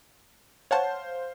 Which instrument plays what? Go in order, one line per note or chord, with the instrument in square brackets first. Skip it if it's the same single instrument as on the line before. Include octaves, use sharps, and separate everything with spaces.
[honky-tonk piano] C5 F5 [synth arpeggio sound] C#5 F#5 A5